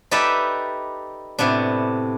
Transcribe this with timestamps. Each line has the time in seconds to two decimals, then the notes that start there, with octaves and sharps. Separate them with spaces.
0.11 D#4 G4 A4 B4 D5 E5
1.39 A2 C3 B3 D4